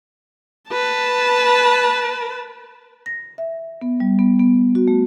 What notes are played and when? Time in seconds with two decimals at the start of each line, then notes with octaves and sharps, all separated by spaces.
0.69 B4 A5
3.06 A#6
3.38 E5
3.82 B3
4.00 G3
4.19 B3
4.39 B3
4.75 F#4
4.88 A3